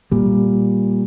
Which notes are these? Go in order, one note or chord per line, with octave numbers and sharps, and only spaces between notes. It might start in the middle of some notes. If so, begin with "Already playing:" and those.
A#2 G3